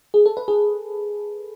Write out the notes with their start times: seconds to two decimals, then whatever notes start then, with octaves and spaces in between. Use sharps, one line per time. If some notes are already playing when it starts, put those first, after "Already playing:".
0.14 G#4
0.26 A4
0.37 B4
0.48 G#4